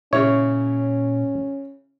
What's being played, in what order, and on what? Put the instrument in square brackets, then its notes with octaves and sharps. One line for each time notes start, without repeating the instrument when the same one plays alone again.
[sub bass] A#2 [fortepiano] C#3 E4 [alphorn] C#4 [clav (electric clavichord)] C#5